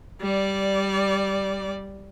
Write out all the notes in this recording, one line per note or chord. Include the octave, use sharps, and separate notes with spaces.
G3 D5